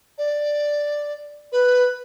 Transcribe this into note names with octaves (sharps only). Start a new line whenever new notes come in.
D5
B4